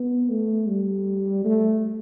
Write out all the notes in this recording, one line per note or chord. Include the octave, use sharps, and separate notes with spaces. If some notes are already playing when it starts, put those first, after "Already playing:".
Already playing: B3
A3
G3
A3